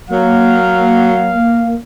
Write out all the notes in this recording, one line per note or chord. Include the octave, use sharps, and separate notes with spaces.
F#3 A#3 F5